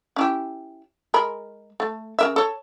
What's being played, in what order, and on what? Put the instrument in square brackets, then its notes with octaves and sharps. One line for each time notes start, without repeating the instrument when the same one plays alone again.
[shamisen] C#4 E4 G4
G#3 A#4 B5
A3
C#3 A#4 E5
A4 C#5